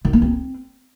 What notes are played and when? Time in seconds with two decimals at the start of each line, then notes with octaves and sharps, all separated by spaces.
0.05 D#3
0.13 A#3
0.22 C4